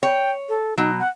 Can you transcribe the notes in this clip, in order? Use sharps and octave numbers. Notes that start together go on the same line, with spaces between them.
C#5 G5
A4
B2 F#3 D#4
F#5